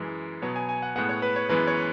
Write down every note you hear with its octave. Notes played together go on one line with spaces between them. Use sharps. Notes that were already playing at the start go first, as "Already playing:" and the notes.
Already playing: F#2 E3 G#3
B2 F#3 B3 C#5
G#5
G#5
F#5
A2 G#3 B3 F#5
C#5
B4
C#5
F#2 E3 G#3 B3 B4
C#5